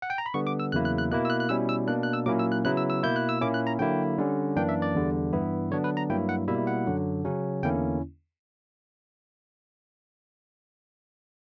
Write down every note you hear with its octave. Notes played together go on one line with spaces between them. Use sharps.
F#5
G5
A#5
B5
D3 G3 B3 C#6
D6
E6
E2 C#3 F#3 A#3 E4 F#6
F#6
F#6
B2 A#3 E4 F#6
E6
F#6
F#6
B2 G3 C#4 E4 E6
E6
B2 A#3 D4 F#6
F#6
E6
A#2 F#3 A#3 C#4 E4 D6
E6
F#6
C#3 F#3 B3 E4 F#6
E6
E6
B2 A#3 E4 G6
F#6
E6
A#2 A#3 C#4 E4 D6
F#6
A#5
D3 F#3 A#3 E4 G5
D3 G3 C#4
F#2 E3 A#3 D4 G5
E5
D5
E2 D3 G3
G2 E3 B3 E4
D3 F#3 B3 D4 C#5
B4
A#5
G2 F#3 A#3 E4 G5
F#5
B2 G3 A#3 E4 E5
F#5
F#2 D3 F#3
C#3 F#3 C#4
E2 D3 A#3 C#4 E4 G5